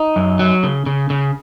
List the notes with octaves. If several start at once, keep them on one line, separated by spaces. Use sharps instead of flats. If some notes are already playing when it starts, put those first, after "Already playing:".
Already playing: D#4
F#2
F#3
C#3
C#3
C#3